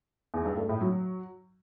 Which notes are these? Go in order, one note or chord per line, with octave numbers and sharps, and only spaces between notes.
E2
G2
A3
A2
F#3